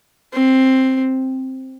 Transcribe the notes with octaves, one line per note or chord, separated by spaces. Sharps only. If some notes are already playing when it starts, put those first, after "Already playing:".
C4